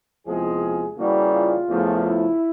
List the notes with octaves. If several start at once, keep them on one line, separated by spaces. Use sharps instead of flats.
E2 C3 F3 G#3 G#4
C#3 E3 G3 A#3 F#4
F4
E2 C#3 F3 A3
E4